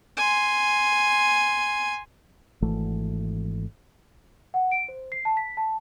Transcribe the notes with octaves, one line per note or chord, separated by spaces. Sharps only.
G#5 C6
G#1 E3 A3
F#5
D7
C5
C7
A5
B6
A5